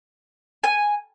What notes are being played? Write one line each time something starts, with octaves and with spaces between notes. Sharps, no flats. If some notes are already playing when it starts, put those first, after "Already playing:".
G#5